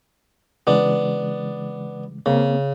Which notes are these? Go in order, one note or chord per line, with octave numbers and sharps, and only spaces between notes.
C#3 E3 G#3 B3 D4
C#3 A#3 C4